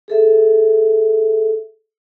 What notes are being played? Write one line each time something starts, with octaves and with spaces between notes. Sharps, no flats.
G#4 A4 E5